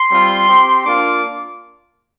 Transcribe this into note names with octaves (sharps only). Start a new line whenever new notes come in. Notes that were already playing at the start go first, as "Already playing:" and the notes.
Already playing: C6
G3 C4 F4
C4 G4
A#3 D4 F4 D6